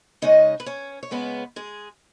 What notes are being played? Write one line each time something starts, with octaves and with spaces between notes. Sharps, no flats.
C#3 G#3 C#4 D#4 D#5
B4
C#4 C#5
C#5
C#3 G#3 B3 C#4 B4
G#3 G#4